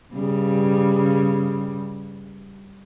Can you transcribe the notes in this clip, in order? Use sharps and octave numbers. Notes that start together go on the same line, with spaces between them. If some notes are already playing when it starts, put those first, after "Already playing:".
G2 C#3 G3